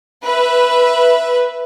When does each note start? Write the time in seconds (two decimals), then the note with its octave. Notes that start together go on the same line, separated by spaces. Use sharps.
0.23 B4 E5